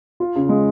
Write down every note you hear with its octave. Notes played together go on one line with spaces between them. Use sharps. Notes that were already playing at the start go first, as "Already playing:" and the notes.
F4
C#3
G#3